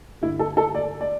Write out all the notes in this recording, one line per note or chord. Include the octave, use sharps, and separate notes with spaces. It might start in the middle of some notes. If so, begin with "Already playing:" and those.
G2 D3 E4
A4
A4
D5
D5